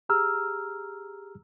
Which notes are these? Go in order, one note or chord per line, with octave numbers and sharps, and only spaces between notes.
G4 G#4 A#5 E6 F6